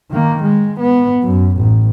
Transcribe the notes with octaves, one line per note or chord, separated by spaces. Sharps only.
D#3 A#3
G#3
B3
F#2
A1